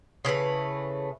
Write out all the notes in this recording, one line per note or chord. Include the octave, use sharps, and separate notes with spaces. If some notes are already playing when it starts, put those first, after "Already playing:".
C#3 E3 A3 B4